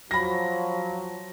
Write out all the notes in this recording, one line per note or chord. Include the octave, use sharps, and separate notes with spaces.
F3 F#3 B5 A#6